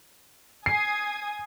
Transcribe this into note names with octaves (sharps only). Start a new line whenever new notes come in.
G#5 D#6 G#6 C7